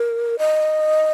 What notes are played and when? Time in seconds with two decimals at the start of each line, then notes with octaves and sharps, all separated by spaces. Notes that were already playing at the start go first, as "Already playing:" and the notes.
Already playing: A#4
0.39 D#5